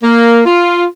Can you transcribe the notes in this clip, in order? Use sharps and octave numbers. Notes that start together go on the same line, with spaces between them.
A#3
F4